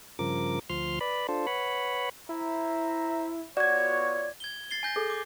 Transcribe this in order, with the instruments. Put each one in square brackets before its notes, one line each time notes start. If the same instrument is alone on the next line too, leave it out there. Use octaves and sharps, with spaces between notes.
[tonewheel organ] G2 C#3 F3 A#4 D6
D2 F3 C6 F6
B4 D5 B5
D4 F4 A4 C5
B4 C#5 F#5 B5
[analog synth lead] E4 [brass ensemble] C5 E5 A#5
[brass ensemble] B3 F4 C#5 [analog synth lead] F#4 [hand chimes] D5 G#6
[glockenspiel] G#6 G7
A6 C7 G7
G#5 G6 A#6
[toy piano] G#4 A4
[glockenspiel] D6